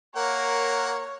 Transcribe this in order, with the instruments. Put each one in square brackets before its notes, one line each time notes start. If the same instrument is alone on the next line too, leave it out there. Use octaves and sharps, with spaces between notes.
[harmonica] A#3 F#5 [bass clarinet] A#4 [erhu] C#5